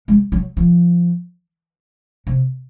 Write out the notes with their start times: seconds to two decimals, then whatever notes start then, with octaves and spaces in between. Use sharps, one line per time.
0.08 G#3
0.32 F#3
0.57 F3
2.27 C3